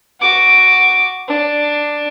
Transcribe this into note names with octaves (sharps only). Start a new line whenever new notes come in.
F#4 D6
D4